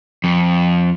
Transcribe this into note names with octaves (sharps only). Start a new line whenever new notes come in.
F2